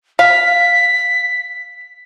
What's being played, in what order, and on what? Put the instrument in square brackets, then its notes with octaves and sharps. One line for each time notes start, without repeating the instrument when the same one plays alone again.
[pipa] F5 [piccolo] B6